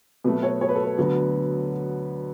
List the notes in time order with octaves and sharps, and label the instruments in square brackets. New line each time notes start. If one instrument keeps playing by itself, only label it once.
[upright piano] B2 F#3 A3 B4
C#5
C#5
B4
A4
B4
D2 D3 F#3 B3